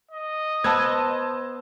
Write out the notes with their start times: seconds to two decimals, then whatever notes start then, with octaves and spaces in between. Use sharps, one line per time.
0.11 D#5
0.64 B3 C5 A5 E6 G#6